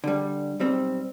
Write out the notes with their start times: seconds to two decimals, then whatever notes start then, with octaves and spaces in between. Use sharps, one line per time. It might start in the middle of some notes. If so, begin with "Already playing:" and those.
0.04 D3 G3
0.59 B1 G3 C4